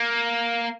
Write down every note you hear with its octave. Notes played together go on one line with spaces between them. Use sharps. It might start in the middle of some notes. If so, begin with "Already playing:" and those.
Already playing: A#3